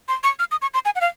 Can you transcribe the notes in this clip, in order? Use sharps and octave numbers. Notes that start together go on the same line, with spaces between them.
C6
C#6
F6
D#6
C#6
C6
G#5
F#5
F5